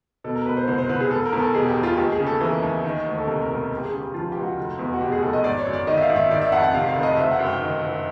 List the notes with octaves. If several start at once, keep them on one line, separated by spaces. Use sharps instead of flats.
B2 A4
A#4
B2 B4
C5
C2 C5
C5
C2 B4
G#4
E1 A4
A#4
E2
A4
B2 G#4
G4
E1
F4
D#2 G4
G#4
C#3
A4
E3 A#4
D#2
D#3
D2
A4
C3 A#4
A#4
E1
A4
C#2
G4
G#4
C#3
G4
F3 F4
C#2 G4
F#4
F1
E2
F#4
B2 G4
G#4
F1 A4
D#5
G#1 D5
C#5
F#2
D5
D#3 D#5
E5
F5
G#1
E5
D#3 D5
E5
F2 F#5
F#5
C3 F5
F5
F1
D#5
F#1 E5
F#5
F#2
G5
D#3
F#1